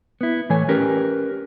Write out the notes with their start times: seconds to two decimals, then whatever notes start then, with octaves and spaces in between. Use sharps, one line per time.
0.21 B3 E4
0.50 A2 E3 A3 C#5 G#5
0.69 C#4 G4 A#4 B4